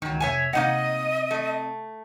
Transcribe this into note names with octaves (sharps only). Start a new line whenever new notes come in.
C#2 D#3 F#3
F2 C3 C#5 E5 G#5
C3 A#3 C4 D#4 D#5 F#5
A3